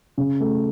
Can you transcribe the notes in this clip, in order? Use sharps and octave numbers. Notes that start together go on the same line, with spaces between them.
C#3
A3